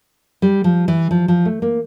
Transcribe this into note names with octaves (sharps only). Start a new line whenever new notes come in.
G3
F3
E3
F3
F3
A3
A#3